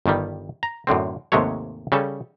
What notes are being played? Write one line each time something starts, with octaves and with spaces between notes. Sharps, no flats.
G1 G2 D#3 G3
A#5
F#2 A2 D3 C4
D#2 G#2 C3 G#3 A3 C#5
C#3 G3 C#4 A4